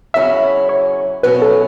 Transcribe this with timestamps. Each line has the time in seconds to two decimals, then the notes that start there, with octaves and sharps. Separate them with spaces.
0.14 C#3 F#3 C#4 E4 E5
0.69 C#5
1.23 B2 F#3 C#4 E4 B4
1.42 A4